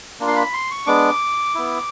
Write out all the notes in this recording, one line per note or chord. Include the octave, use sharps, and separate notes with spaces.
A#3 D4 F4
C6
B5
C6
C#6
G#3 B3 D4 D6
B3 E4